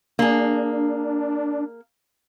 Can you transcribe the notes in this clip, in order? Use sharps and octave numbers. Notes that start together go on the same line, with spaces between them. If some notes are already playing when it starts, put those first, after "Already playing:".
A#3 D4 G#4